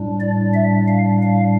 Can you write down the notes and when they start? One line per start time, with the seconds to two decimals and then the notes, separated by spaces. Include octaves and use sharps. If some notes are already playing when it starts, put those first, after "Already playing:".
Already playing: A2 G3 D4
0.20 D5
0.54 E5
0.88 F5
1.22 F5